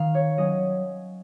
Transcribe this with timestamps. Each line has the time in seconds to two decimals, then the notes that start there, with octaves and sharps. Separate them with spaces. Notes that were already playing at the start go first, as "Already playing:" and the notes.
Already playing: D#3 F5
0.14 C#5
0.37 F#3 C#4 D#5